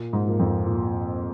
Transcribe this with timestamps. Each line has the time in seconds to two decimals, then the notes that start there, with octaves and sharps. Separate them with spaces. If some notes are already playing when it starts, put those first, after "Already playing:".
Already playing: A#2
0.13 G#2
0.26 F3 A#3
0.39 F2
0.66 A#2